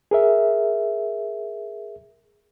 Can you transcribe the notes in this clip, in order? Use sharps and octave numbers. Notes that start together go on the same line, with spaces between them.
G#4 A#4 E5